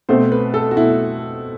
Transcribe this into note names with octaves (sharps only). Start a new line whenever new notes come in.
B2 A3 C4 C5
B4
A4
F#4
B2 A3 E4